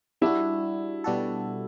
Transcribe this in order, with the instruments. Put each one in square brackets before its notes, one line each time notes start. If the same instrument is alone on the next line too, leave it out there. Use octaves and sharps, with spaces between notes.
[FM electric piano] G3 D4 F#4 [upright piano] E4
[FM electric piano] B2 G3 D4 F#4 A4